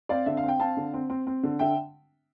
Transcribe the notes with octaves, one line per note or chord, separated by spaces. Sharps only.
C4 D5 F5
D3 E5
F5
C4
G5
C4 F5 A5
D3
C4
C4
C4
D3
D3 E5 G5